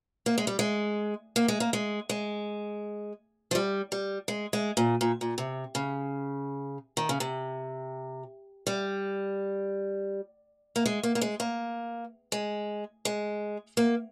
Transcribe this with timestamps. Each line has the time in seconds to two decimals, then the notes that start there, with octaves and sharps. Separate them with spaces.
0.26 A#3
0.38 G#3
0.47 G3
0.59 G#3
1.36 A#3
1.48 G#3
1.60 A#3
1.73 G#3
2.09 G#3
3.51 F3
3.55 G3
3.92 G3
4.28 G#3
4.53 G#3
4.77 A#2
5.01 A#2
5.21 A#2
5.38 C3
5.75 C#3
6.97 D#3
7.09 C#3
7.20 C3
8.67 G3
10.76 A#3
10.86 G#3
11.03 A#3
11.15 A#3
11.21 G#3
11.40 A#3
12.32 G#3
13.05 G#3
13.77 A#3